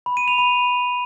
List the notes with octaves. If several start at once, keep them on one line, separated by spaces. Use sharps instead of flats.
B5
D#7
F7
B5